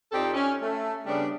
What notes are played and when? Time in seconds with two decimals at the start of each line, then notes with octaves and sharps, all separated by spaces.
0.12 F2 C4 D#4 G4 A4 D5
0.34 C#4
0.62 A3
1.06 C#3 G3 B3 C#4 D4